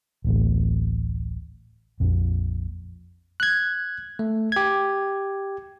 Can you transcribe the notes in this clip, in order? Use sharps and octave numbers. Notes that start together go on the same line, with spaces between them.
D1 A1
A#1 F2
F#6 G#6
A3
G4 G#6